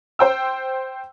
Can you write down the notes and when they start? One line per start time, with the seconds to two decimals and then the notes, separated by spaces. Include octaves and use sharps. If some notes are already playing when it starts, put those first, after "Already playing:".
0.19 C5 G5 E6